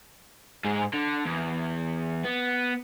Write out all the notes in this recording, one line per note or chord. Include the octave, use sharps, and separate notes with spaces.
G#2 G#4
D3
E2
B3